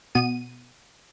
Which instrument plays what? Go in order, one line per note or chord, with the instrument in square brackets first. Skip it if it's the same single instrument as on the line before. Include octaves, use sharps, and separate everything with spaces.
[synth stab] B2 D#7